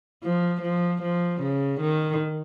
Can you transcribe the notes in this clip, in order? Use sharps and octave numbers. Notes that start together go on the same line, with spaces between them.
F3
F3
F3
C#3
D#3